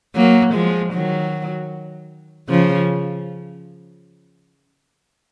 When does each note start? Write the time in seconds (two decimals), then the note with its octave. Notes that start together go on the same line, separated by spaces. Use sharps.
0.16 F#3 A#3
0.54 F3 G#3
0.93 D#3 F#3
2.49 C#3 F3